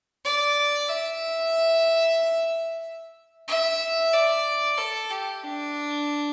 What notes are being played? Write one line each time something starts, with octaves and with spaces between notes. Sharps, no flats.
D5
E5
E5
D5
A4
G4
D4